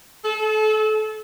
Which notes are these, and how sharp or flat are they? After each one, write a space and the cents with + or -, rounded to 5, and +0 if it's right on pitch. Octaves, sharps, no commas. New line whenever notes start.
A4 -30